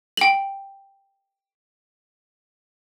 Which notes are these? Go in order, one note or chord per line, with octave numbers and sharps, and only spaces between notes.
G5 F#7